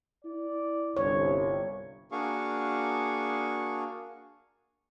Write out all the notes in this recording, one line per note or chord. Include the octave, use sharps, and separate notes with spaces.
E4 D5
G1 C2 C#5
A#3 D4 F#4 G#4 F5 C#6